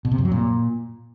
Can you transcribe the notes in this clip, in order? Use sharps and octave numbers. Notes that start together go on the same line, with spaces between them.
B2
C3
F#2
F#3
A#2